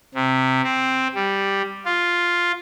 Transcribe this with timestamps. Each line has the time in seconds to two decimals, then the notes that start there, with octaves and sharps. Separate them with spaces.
0.15 C3
0.64 C4
1.14 G3
1.86 F4